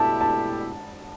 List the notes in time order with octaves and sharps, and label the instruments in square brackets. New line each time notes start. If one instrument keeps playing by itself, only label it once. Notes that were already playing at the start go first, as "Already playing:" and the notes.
Already playing: [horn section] B2 A3 E4 G4 [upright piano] A5
[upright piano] A5